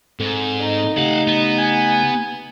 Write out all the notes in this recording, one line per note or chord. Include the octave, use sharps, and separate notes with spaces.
G#2 C4 A4
D#4
C#3 A3 G4 F5 F#5
B3
G#5